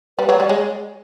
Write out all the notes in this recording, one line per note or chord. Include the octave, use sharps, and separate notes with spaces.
G3 B4
F#3 C#5
G3 D5
G#3 C#5